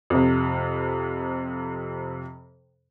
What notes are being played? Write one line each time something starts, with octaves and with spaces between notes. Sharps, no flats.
F2 C3